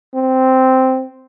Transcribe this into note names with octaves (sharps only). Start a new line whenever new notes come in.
C4